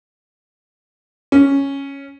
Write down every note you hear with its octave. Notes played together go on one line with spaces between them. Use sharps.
C#4